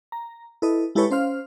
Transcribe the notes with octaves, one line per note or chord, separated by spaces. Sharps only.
A#5
E4 A4 B4 D#5
G#3 E4 G4 A4 B4 C#5
C#4 C5 F5 F6